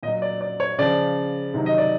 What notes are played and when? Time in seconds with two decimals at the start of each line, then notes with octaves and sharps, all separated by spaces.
0.03 A#2 D#5
0.07 F#3
0.22 D5
0.41 D5
0.60 C#5
0.78 C#3 F3 D5
1.54 C3 D#3 F#3
1.66 D#5
1.78 D5